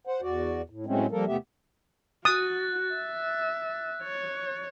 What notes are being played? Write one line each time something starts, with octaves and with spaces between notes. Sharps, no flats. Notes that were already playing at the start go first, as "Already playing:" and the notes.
C5 F#5
E2 F#4 D5
A2
A2 F#3 G#3 A3 C4 C#4
F3 G3 A#3 A4 A#4
E2 C3 A3 B3 G4 E5
F#4 D#6 F#6 A6
E5
C#5